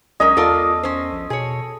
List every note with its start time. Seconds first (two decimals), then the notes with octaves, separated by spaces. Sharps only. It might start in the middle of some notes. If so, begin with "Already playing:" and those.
0.20 B1 G#3 C#4 A#4 D#5
0.37 E2 F4 A4 A#4 D5
0.83 C#4 C5
1.12 A#1
1.30 B2 G#4 C#5